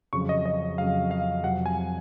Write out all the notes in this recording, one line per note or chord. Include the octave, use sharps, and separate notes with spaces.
F2 C#3 F#3 C#6
D#5
D#5
F2 C#3 F#3 F5
F5
F2 C3 F#3 F#5
G#5